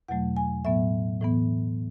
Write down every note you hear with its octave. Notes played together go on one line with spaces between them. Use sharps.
E2 B2 F#3 A3 F#5
G#5
A2 F#3 B3 E5
A2 E3 B3